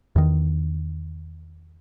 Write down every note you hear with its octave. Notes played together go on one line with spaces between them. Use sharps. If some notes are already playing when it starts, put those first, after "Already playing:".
E2 D#3